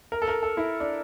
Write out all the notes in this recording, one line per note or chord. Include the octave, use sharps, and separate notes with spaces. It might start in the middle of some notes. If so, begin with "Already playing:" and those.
A#4
A4
A#4
A4
E4
D4